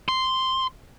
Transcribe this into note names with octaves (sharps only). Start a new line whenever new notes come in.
C6